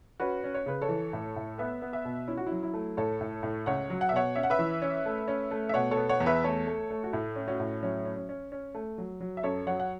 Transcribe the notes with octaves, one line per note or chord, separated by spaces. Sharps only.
C#4 F#4 B4
C#4
C#5
C#3 B4
A4 C#5
E3
A2
A2
B3 B4 E5
B3
B4 E5
B2
C#4 E4
F#4
E4
F#3
E4
A3
A2 A4 C#5
A2
A2
C#2 C#5 F#5
F#3
F#5
E5
B2 C#5 F#5
C#4 E5
F#5
B4 E5
E3
C#4
A3
C#4
A3
E5
B2 C#5 F#5
A4 C#5
B3
C#5 F#5
E2
B4 E5
A3 A4 C#5
A3
A3
F#4
A2 E4
C#4
C#4 F#4
A2
F#3 C#4
C#4
C#4
C#4
C#4
A3
F#3
F#3
E5
F#2 A4 C#5
F#3 C#5 F#5
F#5